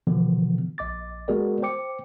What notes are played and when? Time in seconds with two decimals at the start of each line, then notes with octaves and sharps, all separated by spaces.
0.07 B2 D3 E3 F3 B3
0.78 A#1 D#5 D6 A6
1.28 G#3 B3 F#4 G#4 A#4 D5
1.62 C5 G5 D6 C#7